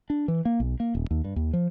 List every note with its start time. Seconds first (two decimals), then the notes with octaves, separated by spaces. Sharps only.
0.10 D4
0.28 E3
0.45 A#3
0.60 B1
0.80 A#3
0.95 D#1
1.11 D#2
1.24 G2
1.36 D#2
1.53 F3